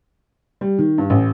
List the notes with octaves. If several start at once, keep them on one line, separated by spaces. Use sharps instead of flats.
G3
D#3
G2
A1